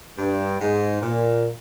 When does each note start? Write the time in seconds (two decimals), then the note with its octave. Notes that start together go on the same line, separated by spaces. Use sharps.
0.18 G2
0.60 G#2
1.01 A#2